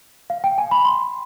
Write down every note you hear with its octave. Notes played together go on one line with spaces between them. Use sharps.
F5
G5
G#5
B5
C6